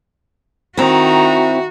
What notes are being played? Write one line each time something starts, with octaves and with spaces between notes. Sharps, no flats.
D#3 C4 E4 F#4 A#5